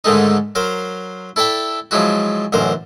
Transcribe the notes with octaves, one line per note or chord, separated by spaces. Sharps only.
G#2 D3 D#3 G#3 A3 D#4
F#3 A#4 C5 F5
E4 A4 D5 E5 G5
F3 F#3 G#3 E4 F#4
A1 F#2 D3 A#4 C5